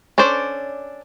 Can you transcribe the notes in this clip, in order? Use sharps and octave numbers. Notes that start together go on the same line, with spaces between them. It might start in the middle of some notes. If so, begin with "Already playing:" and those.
C#4 D4 A4 C5 D5